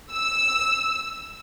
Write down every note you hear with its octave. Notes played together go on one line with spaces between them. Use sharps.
E6